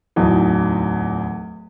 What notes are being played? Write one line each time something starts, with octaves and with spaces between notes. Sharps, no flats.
D1 E2 D#4